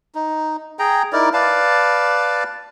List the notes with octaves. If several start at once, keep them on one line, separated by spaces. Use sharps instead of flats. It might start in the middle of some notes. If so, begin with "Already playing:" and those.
D#4
G#4 G5 A#5
D#4 E4 A#4 D5
B4 D5 F5 A5